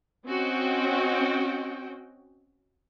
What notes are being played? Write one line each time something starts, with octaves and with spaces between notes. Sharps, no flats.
C4 C#4 F#4 D#5 G5